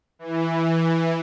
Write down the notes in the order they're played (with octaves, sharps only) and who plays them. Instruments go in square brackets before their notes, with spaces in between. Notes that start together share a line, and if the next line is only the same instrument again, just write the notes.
[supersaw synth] E3